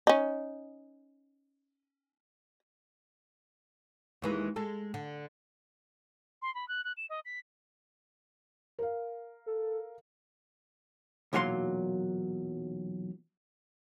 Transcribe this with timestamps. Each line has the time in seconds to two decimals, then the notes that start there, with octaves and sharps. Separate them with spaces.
0.07 C#4 D#4
4.22 D#2 E3 G#3
4.56 G#3 A4
4.94 D3
6.42 C6
6.55 B5
6.68 F#6
6.84 F#6
6.97 E7
7.09 D#5
7.25 B6
8.79 A#4 F5
9.46 A4
11.33 B1 E2 A#2 F#3 F5 C6